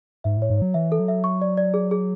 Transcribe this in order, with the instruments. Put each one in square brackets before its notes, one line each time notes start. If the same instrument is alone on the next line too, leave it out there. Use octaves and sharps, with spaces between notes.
[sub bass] G#2 [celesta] E5
[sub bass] A2 [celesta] C#5
[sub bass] G#2
[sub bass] F#3 [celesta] C#5
[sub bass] E3 [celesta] E5
[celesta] A4
[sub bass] F#3
[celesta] E5
C#6
D5
D5
G#4
G#4